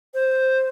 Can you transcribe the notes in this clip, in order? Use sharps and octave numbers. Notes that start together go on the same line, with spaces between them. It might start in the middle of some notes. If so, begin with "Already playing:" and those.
C5